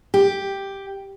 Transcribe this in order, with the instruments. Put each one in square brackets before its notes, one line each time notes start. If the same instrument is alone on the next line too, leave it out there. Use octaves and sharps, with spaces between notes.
[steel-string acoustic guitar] G4